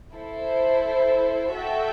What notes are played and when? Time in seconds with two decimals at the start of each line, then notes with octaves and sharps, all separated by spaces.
0.14 E4 A4 C5
1.53 F#4 A4 E5 G5